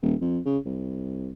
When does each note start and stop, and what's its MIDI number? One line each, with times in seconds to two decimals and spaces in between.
0.02 0.15 27
0.21 0.39 41
0.45 0.58 49
0.65 1.32 36